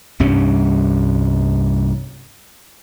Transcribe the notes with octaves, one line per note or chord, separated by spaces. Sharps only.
C2 G2 G3 C#4